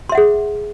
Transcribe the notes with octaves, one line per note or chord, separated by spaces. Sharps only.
G#4 E5 F#5 C6